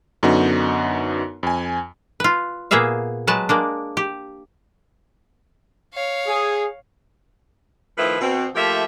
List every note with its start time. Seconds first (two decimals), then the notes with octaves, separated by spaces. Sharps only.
0.23 F#2 D3 B3 D#4 F#4
1.43 F2 G#5
2.20 F4 B4
2.71 A#2 A#3 B3 G#4 E5 F5
3.27 F#3 G#3 B4 A5
3.49 G#3 A#3 D4
3.97 G4
5.94 C#5 F5
6.27 G#4
7.98 D#3 F3 A3 E4 F4 B4
8.21 B2 C4
8.55 F3 A3 A#3 G4 E5